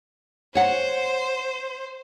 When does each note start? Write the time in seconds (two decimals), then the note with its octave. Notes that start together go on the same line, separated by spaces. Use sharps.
0.55 C5 C#5 F#5